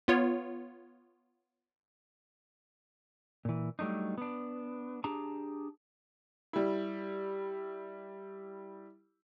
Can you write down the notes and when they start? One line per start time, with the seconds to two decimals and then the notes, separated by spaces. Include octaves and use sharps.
0.08 B3 F4 C#5
3.45 A#2 E3
3.79 F#3 G3 A3 D4 D#4
4.18 B3 D4
5.04 D4 G4 G#4 A5 A#5
6.53 G3 E4